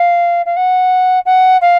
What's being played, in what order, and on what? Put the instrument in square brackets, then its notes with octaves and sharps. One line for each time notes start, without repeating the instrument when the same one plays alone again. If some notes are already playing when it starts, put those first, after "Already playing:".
Already playing: [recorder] F5
F5
F#5
F#5
F5